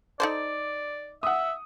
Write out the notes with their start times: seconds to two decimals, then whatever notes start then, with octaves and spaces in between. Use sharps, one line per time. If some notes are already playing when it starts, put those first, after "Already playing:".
0.20 D#4 A4 C5 D5
1.23 E5 F#5 D#6